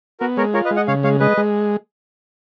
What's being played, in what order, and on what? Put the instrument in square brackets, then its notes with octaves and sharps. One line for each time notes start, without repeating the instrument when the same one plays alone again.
[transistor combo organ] B3 [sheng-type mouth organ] F#4 A#4
[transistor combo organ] G#3 [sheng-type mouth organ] A#4 C#5
[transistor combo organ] F4 [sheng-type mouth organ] A#4 C#5
[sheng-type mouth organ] B4 D#5
[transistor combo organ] G#3
[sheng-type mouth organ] D#5 F#5
[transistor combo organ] C#3 [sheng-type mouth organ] C#5 F5
[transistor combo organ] G#3 [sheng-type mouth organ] C#5 F5
[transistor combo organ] G#3 [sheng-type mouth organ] B4 D#5
[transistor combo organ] G#3